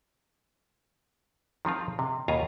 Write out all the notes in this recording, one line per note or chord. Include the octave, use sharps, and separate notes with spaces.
D#3 F3 C4 F4
C3
D#2 B2 F4 G#5 A#5